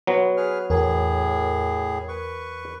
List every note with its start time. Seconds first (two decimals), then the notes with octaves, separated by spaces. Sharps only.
0.07 F#3 B3
0.37 G#4 B4 F6
0.70 E2 A2 G#4 A#4
2.08 B4 C#6